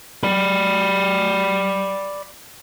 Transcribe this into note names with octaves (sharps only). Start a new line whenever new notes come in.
D5 B5